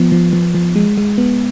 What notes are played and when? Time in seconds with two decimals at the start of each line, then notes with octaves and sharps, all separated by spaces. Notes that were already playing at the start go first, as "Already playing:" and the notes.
Already playing: F3 B3
0.12 F3
0.33 F3
0.55 F3
0.76 G#3
0.98 G#3
1.18 B3